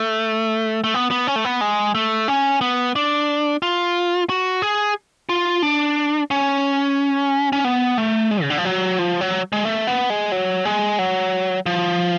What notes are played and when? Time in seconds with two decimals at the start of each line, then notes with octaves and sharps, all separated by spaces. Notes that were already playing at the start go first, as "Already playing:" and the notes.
Already playing: A3
0.84 A3
0.94 B3
1.11 B3
1.27 C#4
1.36 A3
1.45 B3
1.61 G#3
1.95 A3
2.28 C#4
2.61 B3
2.95 D4
3.62 F4
4.30 F#4
4.62 G#4
5.29 F4
5.63 D4
6.31 C#4
7.53 C#4
7.64 B3
7.98 A3
8.31 G#3
8.42 C#3
8.50 D3
8.58 F3
8.65 F#3
8.99 F3
9.21 F#3
9.53 G#3
9.65 A3
9.87 B3
10.10 G#3
10.32 F#3
10.65 G#3
10.99 F#3
11.66 F3